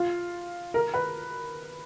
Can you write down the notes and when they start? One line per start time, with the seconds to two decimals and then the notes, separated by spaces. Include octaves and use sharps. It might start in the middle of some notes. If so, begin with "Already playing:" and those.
Already playing: F4
0.74 A#4
0.94 B4